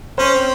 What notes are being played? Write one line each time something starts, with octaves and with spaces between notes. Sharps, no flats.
C#4 C5
C4